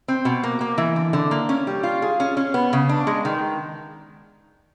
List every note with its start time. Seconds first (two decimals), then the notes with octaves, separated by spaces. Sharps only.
0.08 C4
0.25 B2
0.44 A#3
0.61 A#3
0.78 E3
0.96 D3
1.13 D3
1.31 A#3
1.49 C#4
1.67 G3
1.83 F4
2.02 G#4
2.20 C#4
2.37 C#4
2.54 B3
2.73 C#3
2.89 D4
3.07 G#3
3.25 D#3